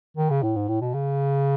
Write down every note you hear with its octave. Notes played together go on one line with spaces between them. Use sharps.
D#3
C#3
A2
G#2
A2
B2
C#3